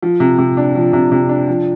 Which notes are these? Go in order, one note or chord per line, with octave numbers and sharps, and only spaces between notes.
F3
C3
C3
D4
F3
C3
C3
D4
F3